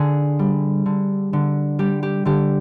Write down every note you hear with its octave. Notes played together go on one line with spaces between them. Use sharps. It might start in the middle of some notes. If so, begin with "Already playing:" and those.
Already playing: D3 G#4
G3
D3
D3
G3 G4
G4
D3 G4